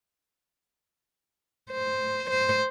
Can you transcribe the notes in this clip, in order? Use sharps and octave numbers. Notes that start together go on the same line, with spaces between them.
C5
C5